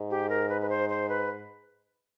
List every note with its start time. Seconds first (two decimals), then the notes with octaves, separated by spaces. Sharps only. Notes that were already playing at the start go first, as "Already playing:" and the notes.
Already playing: G#2
0.10 G4
0.29 A#4
0.49 B4
0.62 B4
0.69 C5
0.89 C5
1.09 B4